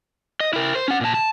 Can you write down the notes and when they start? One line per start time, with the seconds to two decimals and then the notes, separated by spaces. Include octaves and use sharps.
0.40 D#5
0.53 E4 A#4
0.75 C5
0.88 C#4 F#5
1.01 A#2 A5
1.14 A5